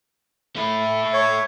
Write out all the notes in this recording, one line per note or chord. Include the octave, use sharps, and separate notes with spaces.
A3 E4
C#5